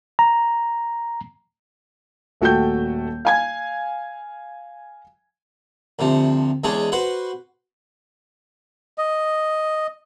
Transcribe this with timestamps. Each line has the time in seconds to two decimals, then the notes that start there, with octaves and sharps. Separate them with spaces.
0.19 A#5
2.41 D#1 A3 F#4 G5 A5 G6
3.25 F5 G#5 G#6
5.99 D2 C3 F3
6.64 E2 G#3 C#4 D4 G#4
6.92 F#4 B4 C5 F#5
8.98 D#5